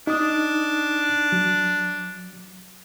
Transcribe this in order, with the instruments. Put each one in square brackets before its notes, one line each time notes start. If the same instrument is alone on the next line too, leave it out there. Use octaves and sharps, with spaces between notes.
[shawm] D4 [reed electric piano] D#4 D#6
[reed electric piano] F#3